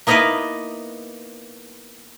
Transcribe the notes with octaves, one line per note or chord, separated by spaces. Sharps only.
A#3 B3 D#4 E4 A#4 B4